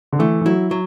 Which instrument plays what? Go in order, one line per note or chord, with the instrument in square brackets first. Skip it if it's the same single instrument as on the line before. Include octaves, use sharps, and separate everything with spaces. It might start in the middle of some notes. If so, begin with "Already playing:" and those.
[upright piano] D3
[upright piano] E3 [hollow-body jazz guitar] A3
[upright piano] E3
[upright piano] F#3 [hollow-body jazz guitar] E4
[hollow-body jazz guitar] F#3